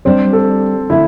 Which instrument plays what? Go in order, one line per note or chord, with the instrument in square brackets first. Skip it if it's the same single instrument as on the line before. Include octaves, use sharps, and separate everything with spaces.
[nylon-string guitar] G3 D4 G4 [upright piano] C4 C5
[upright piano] A4
[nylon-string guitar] D3 A3 [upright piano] E4 E5